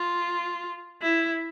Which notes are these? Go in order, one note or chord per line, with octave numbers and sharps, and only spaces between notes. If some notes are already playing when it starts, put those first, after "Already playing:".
Already playing: F4
E4